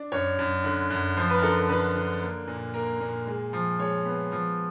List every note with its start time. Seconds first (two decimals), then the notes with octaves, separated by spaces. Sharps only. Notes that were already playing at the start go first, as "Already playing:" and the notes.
Already playing: D4
0.12 F#2 C#5
0.39 F#2
0.64 D3
0.90 F#2
1.17 F3 C5
1.30 B4
1.38 A#4
1.43 D3 A4
1.56 A#4
1.69 D3 B4
1.95 D3
2.22 A#3
2.47 A#2
2.74 A#3 A#4
3.00 A#2
3.27 G#3
3.53 F3
3.79 G#3 C#5
4.05 B3
4.32 F3